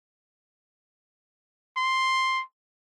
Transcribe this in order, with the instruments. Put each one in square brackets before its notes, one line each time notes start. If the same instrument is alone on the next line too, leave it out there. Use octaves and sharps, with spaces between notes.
[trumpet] C6